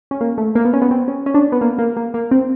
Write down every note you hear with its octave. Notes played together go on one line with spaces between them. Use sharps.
C#4
A#3
A3
A#3
B3
C#4
B3
C4
C#4
C#4
D4
B3
A#3
A#3
A#3
A#3
C4